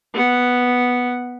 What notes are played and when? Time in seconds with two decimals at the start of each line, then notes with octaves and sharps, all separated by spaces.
0.14 B3 F#5